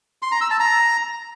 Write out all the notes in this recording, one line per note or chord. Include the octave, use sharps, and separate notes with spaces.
C6
A#5
E6
A5
A#5